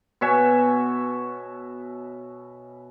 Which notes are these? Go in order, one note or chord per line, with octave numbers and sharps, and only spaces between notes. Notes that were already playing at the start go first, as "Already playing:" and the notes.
B2 C#5 E5 G#5